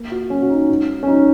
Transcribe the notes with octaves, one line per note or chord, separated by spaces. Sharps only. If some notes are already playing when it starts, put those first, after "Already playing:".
Already playing: A#3
F#4
F#3 C#4
F#4
D#4
G#2 F#4
C#4
F#3 D#4